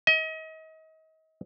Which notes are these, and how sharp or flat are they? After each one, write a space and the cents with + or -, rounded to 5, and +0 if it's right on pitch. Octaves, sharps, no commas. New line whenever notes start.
D#5 +35